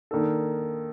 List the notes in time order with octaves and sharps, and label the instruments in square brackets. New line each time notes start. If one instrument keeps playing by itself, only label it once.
[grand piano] D#3 A#3 D4 A4